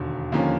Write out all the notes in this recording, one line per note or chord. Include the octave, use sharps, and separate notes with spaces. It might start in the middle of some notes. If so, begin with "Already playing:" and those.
Already playing: E1 D#2 D3
D#2 D3 F3 A#3 C#4